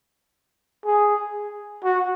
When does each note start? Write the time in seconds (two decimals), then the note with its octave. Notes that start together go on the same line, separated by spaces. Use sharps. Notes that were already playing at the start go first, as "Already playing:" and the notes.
0.86 G#4
1.84 F#4